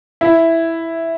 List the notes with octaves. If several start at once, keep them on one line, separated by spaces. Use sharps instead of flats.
E4